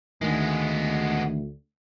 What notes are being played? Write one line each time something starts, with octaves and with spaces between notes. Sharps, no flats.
D2 D#3 G#3 B3